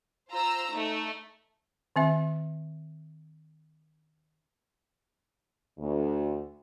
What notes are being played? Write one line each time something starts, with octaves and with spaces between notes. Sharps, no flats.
F4 C5 A#5 E6
A3 D#4
D#3 C4 E5
D2